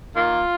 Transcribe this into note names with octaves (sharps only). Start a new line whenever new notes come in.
D#3 A#3 F4